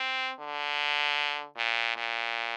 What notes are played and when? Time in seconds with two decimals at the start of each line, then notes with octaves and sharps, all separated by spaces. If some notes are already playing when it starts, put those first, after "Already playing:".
Already playing: C4
0.39 D3
1.57 A#2
1.96 A#2